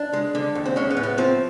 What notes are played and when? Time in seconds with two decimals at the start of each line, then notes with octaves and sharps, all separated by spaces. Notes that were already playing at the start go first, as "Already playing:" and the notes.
Already playing: D4
0.13 G#3
0.35 D3
0.55 D#2
0.65 C4
0.76 G#3 C#4
0.90 B3
0.97 A2
1.03 B3
1.18 F3 C4